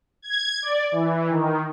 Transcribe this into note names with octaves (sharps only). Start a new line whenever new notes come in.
G#6
D5
E3
D#3